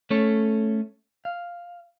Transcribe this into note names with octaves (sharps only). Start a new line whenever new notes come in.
A3 C#4 A4 C#5
F5